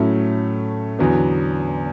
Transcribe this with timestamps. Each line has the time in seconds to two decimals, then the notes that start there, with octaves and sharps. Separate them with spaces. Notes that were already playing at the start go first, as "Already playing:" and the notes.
Already playing: A2 F#3 A3 C#4
0.99 E2 D3 F#3 B3